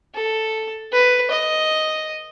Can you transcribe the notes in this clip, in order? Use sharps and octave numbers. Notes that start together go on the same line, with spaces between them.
A4
B4
D#5